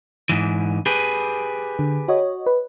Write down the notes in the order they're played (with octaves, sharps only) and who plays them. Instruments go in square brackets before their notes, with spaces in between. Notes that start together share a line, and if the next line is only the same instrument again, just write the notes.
[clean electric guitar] G#2 E3
G4 G#4 B4
[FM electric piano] D3
F#4 C#5 D#5
B4